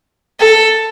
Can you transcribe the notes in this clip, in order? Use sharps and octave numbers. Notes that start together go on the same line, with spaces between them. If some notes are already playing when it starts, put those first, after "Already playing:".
A4